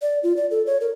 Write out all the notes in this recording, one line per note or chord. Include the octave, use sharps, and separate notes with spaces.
D5
F4
D5
A4
C#5
A#4